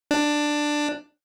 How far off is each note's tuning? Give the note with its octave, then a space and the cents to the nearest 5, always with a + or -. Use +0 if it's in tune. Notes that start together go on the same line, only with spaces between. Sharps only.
D4 +10